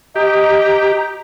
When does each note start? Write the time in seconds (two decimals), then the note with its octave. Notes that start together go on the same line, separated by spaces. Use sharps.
0.16 G4 D#5 A#5